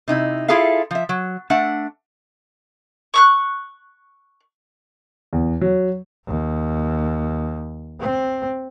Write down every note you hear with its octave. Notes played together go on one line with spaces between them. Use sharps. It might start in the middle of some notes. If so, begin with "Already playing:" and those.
C3 D#4 E4
E4 F4 G#4 A4 E5 F5
F3 E5
F#3
A3 D4 E5 F#5
C#6 E6 F#6
E2
F#3
D#2
C4